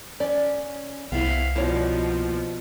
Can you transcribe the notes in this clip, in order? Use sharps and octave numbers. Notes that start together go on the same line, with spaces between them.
C#4 D5
C2 B3 E4 C5 F5
B2 F3 A#3 E4 C#5 D5